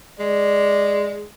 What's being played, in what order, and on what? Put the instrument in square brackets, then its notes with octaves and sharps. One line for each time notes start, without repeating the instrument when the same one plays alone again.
[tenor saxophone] G#3 [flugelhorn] D5